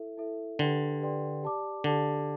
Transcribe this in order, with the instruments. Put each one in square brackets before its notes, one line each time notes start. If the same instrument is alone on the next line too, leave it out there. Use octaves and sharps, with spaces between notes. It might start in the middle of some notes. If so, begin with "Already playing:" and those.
Already playing: [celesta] E4 A4 E5
E4 A4 E5
[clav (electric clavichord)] D3 [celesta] G4 B4 D5 G5 C6
[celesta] G4 B4 D5 G5 C6
G4 D5 A5 D6
[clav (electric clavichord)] D3 [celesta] G4 D5 A5 D6